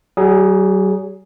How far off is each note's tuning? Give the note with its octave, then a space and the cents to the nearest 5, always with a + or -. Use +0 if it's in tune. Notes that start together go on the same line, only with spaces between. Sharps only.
F#3 +45 G#4 +0